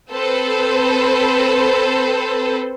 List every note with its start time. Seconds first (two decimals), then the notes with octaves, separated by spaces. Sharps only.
0.11 C4 A4 B4 C5